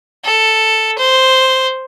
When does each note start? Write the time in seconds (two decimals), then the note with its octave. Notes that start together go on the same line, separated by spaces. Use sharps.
0.24 A4
0.98 C5